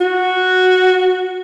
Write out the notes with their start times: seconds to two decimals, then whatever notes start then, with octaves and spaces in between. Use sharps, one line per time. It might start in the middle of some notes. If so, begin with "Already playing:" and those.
0.01 F#4